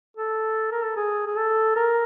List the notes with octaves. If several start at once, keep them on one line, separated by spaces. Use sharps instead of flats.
A4
A#4
A4
G#4
G#4
A4
A#4